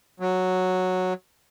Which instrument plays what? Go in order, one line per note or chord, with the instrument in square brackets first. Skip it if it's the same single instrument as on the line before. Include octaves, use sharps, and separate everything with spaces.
[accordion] F#3